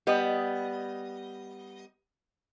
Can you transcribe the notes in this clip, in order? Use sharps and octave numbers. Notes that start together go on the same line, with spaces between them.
G3 B3 D#5